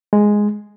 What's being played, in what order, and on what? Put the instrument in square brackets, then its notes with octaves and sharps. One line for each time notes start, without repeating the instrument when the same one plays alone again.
[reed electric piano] G#3